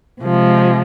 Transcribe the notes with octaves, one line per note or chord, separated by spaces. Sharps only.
C3 F3 G#3